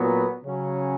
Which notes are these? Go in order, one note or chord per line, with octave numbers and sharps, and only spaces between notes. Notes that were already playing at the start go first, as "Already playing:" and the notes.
Already playing: A#2 F#3 B3
C#3 F#3 C#4